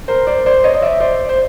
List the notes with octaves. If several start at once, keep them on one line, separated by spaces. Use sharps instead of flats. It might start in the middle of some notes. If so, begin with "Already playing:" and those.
A#4 C5
C5 D5
C5 D5
C#5 D#5
D#5
D5 E5
C5 D5
C5